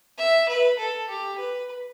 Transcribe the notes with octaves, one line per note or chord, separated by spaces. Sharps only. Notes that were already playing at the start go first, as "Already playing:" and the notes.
E5
B4
A4
G4
B4